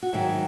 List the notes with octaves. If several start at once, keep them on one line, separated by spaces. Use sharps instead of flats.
F#4
G#2 D#3 F#3 E4